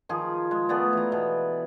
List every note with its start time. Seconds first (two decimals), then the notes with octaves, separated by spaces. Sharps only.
0.09 D#3 F3 G#4
0.51 G#3
0.69 A3 B3 G#4 D5
0.93 E3 A#5
1.12 B2